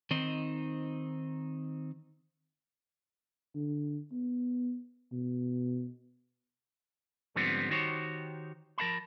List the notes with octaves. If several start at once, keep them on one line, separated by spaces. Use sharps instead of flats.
D#3 C4 D#4 C5
D3
B3
B2
G#2 D3 F3 G3 B3 C4
D#3 D#4 F#4 G4 C5 C#5
F3 A#4 F5 A5 B5